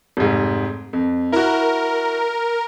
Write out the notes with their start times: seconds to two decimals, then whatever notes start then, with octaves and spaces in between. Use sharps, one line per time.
0.17 F1 G#2
0.93 F2
1.32 E4 F#4 A#4